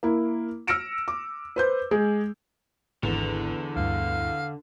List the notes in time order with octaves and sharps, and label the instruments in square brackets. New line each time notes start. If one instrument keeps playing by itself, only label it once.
[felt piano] A#3 E4
E6 F6 A#6 C#7 D7 E7
D6
B4 C5 G6
G#3 G#4
[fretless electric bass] G#1 [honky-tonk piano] E2 [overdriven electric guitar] D3
[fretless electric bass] D2 G2 [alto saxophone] F5